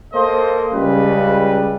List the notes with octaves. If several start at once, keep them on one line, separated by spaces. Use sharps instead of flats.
A#3 A4 C5 D#5
C#2 C#3 G3 B4